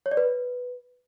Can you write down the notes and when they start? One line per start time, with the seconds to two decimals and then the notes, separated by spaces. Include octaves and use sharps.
0.06 C#5
0.11 D5
0.17 B4